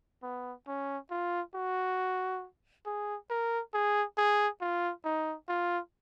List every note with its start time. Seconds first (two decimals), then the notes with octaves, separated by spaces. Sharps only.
0.23 B3
0.67 C#4
1.11 F4
1.55 F#4
2.86 G#4
3.30 A#4
3.74 G#4
4.18 G#4
4.61 F4
5.05 D#4
5.49 F4